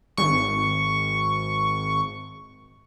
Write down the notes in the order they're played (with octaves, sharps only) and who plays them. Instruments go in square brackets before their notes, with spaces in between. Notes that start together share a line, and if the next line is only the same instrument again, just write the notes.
[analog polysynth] G#1 C#6